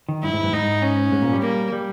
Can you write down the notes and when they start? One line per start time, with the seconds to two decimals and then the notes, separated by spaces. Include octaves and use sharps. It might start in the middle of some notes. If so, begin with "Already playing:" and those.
0.09 D#3
0.23 G2 E4
0.33 G#2
0.43 G2
0.52 G#2 D#4
0.82 C#4
1.12 G#2
1.22 A#2
1.33 G3
1.42 A#3
1.72 G3